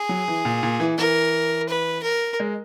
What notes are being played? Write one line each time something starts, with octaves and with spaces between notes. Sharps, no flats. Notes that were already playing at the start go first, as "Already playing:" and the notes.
Already playing: G#4
F#3
E3
A#2
A#2
E3
E3 A#4
B4
A#4
G#3